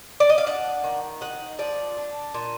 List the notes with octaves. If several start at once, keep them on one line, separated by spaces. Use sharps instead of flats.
D5
D#5
F5
D4 F#5
D#3
D#4 F#5
F3 D5
D4
A#2